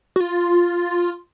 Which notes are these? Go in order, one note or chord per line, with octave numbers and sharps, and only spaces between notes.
F#4
F4